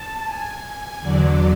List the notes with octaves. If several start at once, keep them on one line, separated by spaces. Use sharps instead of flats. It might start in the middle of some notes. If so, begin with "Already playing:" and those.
Already playing: A5
G#5
E2 D3 F#3 D5